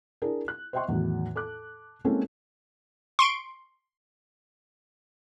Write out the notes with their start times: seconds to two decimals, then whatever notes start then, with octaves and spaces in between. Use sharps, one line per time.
0.22 D4 E4 G#4 A#4
0.48 F#6
0.73 C5 D#5 E5 G5 C6 C#6
0.88 E2 A2 D#3 F#3
1.36 A4 D6 F#6
2.04 G#3 A#3 C4 C#4 E4 A4
3.19 C6 C#6 D7